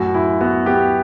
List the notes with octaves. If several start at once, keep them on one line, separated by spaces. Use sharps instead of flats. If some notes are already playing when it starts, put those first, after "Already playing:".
Already playing: F#2 A2 F#4
F#2 E4
B3 F#4
B3 G4